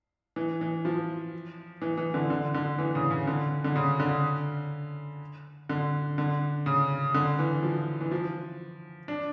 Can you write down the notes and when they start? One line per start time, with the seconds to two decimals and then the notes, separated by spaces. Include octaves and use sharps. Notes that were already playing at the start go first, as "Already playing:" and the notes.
0.36 E3
0.61 E3
0.85 F3
1.82 E3
1.97 E3
2.14 D3
2.30 D3
2.54 D3
2.79 E3
2.95 C#3
3.11 C#3
3.27 D3
3.64 D3
3.76 C#3
4.00 D3
5.69 D3
6.18 D3
6.66 C#3
7.14 D3
7.39 E3
7.63 F3
8.01 E3
8.11 F3
9.08 D4